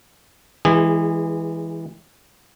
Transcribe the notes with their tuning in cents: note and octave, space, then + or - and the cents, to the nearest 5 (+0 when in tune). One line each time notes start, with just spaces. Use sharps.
E3 +0 G#3 +0 G#4 -30